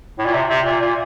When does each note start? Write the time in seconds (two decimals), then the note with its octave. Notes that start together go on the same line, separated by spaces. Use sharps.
0.19 A2
0.26 A#2
0.33 C3
0.49 C3
0.65 A#2
0.82 A#2